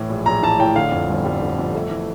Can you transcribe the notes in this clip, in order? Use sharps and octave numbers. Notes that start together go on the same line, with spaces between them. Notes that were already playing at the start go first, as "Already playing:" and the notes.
Already playing: A2 E3
A#1
A#1 A#5
E3 A5
A2 G5
D3 F5
F2
G1
G3
D3
F2
A3
E3